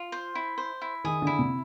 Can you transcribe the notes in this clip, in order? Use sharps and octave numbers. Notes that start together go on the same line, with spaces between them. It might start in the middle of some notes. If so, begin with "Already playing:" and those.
Already playing: F4
C5
E4
C5
E4
D#3 G#4
D3 E4
C3